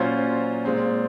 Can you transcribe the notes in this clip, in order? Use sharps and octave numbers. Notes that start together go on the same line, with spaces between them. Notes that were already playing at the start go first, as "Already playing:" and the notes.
Already playing: A#2 F#3 C#4 F4 C5
A#2 G#3 C4